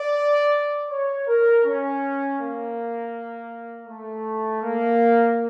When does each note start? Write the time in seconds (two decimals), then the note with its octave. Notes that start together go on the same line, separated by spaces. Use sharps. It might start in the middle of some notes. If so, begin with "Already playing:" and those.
Already playing: D5
0.90 C#5
1.28 A#4
1.65 C#4
2.40 A#3
3.88 A3
4.63 A#3